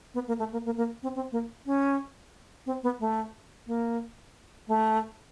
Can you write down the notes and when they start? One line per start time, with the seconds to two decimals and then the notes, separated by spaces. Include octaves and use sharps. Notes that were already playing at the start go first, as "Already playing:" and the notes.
0.14 B3
0.27 A#3
0.39 A3
0.52 A#3
0.65 A#3
0.77 A#3
1.03 C4
1.15 C4
1.32 A#3
1.66 C#4
2.66 C4
2.83 B3
3.00 A3
3.67 A#3
4.68 A3